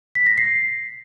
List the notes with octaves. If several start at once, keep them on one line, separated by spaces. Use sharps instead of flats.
B6
A#6
C7